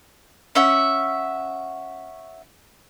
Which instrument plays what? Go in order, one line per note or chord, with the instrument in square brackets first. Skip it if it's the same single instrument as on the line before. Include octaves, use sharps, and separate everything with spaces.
[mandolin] C#4 E5 F#5